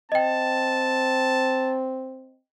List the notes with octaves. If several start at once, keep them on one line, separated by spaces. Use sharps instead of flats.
C4 D#5 G5 A5